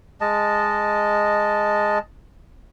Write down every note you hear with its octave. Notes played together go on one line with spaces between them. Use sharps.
G#3 D#5 A5